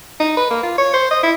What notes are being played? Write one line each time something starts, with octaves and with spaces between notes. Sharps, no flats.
D#4
B4
A#3
F4
C#5
C5
D#5
E4